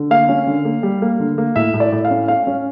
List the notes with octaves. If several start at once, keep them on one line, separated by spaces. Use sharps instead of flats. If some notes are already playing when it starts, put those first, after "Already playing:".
Already playing: D3
A#3 F5
C#4
D3
A#3
G3
A#3
D3
A#3
A2 E5
A2
D5
A2
F5
C#4
C#4 F5
C#4